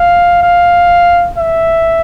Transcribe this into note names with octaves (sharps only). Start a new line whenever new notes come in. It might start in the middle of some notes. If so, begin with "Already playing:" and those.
Already playing: F5
F5
E5